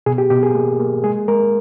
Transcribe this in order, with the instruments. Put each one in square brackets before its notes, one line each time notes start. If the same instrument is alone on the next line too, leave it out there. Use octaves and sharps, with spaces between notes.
[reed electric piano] B2 G#4
G4
B2 G4
G#4
A#3
A#3
G#3 G#4
G#3 A#4